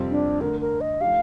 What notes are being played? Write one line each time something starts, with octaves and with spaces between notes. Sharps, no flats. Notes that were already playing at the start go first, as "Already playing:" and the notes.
Already playing: F2 C3 G3 C4 F4
D4
D3 A3 D4 A#4
A#4
D#5
F3 A3 D#4 G4 F5